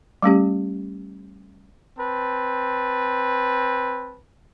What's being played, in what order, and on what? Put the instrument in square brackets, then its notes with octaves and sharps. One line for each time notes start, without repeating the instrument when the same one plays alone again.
[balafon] G3 A3 C#4 G4
[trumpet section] C4 B4 A5